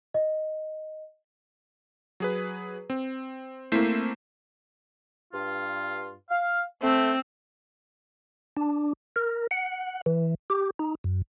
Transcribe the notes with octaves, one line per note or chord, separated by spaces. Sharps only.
D#5
F#3 G#4 B4
C4
A3 A#3 C4 E4
G2 F4
F5
A3 C4
D4
A#4
F#5
E3
G4
D#4
F#2